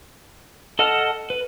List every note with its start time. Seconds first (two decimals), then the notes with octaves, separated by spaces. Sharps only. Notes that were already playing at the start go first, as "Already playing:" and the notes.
0.79 A4 D#5 F#5 A5 F6
1.30 B4